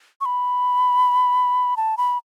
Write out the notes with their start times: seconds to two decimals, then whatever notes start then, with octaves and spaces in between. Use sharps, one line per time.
0.21 C#6
0.25 B5
1.77 A5
1.98 B5